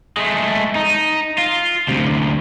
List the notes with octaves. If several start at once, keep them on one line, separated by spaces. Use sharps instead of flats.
G#3 A3
D#4
F4
D2 C3